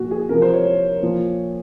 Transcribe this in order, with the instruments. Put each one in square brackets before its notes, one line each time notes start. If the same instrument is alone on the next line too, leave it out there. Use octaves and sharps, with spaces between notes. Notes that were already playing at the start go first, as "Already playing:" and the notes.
Already playing: [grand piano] A#2 F3 F#4
G#4
C3 A#4
F3
C5
C#5
C#5
A#2 F3